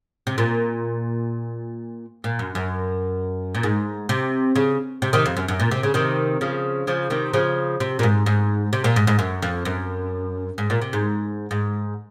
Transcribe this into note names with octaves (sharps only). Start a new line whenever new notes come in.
C3
A#2
A#2
F#2
F#2
A#2
G#2
C3
C#3
C3
C3 D#3
F2
F#2
F#2
A#2
C3
C#3
C3 D#3
C#3 F3
C#3 F3
C3 D#3
C#3 F3
C3
A#2
G#2
G#2
C3
A#2
G#2
G#2
F#2
F2
F#2
G#2
A#2
C3
G#2
G#2